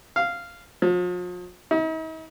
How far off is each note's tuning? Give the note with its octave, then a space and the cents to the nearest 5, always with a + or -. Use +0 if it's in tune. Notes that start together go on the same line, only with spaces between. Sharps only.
F5 -10
F3 +40
D#4 +45